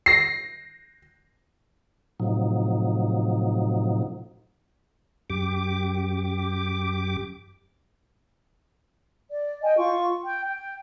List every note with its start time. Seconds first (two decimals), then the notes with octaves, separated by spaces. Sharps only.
0.06 A#6 C7
2.20 A2 C3 F3 F#3 D#4
5.30 F#2 G4 D6
9.31 D5
9.62 D#5 G5 G#5
9.78 F4 C#6
10.23 G5
10.45 G5